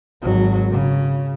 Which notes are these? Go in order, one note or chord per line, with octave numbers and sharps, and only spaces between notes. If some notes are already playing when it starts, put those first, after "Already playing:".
G#1 F#3
C#3